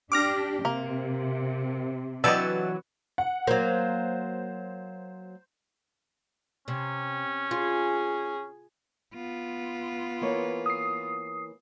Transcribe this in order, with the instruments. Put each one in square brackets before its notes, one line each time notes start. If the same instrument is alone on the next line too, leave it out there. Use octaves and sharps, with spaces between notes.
[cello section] D4 G4 [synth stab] D6 F6 A#6
[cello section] C3 [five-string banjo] A#3
[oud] E3 F#3 [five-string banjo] D4 G4 D#5 [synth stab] E6 A6
[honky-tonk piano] F#5
[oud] F#3 A#3 [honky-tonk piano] C5
[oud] C3 [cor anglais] C#4
[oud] F4 [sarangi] G#4
[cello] B3 F4
[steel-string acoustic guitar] E3 A#3 C#5
[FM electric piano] D#6 C7